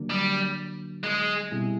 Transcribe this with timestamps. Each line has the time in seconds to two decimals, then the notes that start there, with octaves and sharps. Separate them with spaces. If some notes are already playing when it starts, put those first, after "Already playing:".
Already playing: D3 F#3 A#3 D4
0.10 G3
1.04 G#3
1.51 B2 G3 C4 E4 G#4